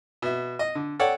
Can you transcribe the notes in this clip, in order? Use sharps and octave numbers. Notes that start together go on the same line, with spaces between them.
B2 E5
D#5
D3
A4 C#5 D5 F#5 G5